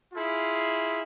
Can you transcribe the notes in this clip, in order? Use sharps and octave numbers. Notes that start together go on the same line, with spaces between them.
E4 F4 G#4